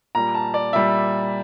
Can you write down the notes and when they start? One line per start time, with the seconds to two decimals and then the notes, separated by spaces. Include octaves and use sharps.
0.15 A#2 G3 A#5
0.34 A5
0.54 D5
0.73 A#2 G3 E5